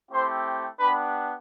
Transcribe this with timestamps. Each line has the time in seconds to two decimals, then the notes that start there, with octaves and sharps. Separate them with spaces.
0.11 A3 C4 E4 G4 C5 C6
0.80 B3 D4 G4 B4 B5